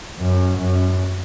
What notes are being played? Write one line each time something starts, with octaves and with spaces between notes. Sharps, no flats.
F#2
F#2